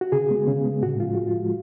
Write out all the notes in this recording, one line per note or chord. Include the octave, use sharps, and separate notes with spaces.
F#4
C#3 G#4
G#3 B3
C#3
G#3 B3
A2 F#4
F3 G#3 F4
A2 F#4
F4
F3 G#3